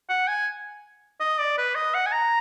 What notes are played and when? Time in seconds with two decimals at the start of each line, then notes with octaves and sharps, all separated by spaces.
0.09 F#5
0.28 G#5
1.20 D#5
1.39 D5
1.58 B4
1.75 D#5
1.94 F#5
2.07 G#5
2.12 A#5